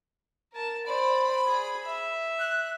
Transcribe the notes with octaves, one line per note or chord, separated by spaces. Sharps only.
A#4 A5
C5 D5 B5
G#4
E5
F#6